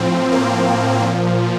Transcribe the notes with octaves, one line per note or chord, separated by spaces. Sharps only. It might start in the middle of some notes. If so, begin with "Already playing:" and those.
Already playing: A2 F3 C4
A#3
A#2 F3